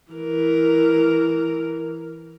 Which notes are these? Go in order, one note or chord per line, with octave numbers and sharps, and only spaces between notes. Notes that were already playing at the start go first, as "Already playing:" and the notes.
E3 A#4